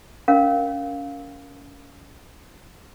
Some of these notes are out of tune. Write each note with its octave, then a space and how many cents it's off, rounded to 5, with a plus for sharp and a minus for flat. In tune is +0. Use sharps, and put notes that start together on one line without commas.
C#4 +25 A#4 +0 F5 +5